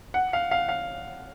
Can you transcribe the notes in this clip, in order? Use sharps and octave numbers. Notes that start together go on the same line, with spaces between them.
F#5
F5
F5
F5